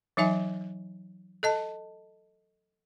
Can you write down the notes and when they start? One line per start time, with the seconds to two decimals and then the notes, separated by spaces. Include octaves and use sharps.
0.17 E3 F#3 D#4 E5 G#5
1.43 A4 D#5 A5